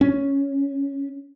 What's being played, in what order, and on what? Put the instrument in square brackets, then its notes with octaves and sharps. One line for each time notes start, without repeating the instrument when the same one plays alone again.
[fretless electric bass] C#4